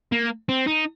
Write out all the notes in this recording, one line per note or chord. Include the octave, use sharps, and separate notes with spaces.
A#3
C4
D#4